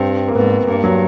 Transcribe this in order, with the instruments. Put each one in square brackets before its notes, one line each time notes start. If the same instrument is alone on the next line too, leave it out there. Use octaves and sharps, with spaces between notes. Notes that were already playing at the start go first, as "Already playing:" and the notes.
Already playing: [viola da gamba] G2 [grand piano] C4
[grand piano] A#3
[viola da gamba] G#2 [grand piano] B3
[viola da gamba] G2 [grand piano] A#3
[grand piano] F#3